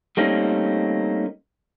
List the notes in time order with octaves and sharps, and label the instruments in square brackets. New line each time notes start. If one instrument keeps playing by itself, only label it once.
[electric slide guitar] G3 A3 A#3 C4 C#4 D#4